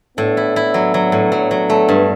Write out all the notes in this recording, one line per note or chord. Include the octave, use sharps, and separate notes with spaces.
A2 B3 D4
E4
E4
F#3
F#3
A2
F#3
F#3
A3
G2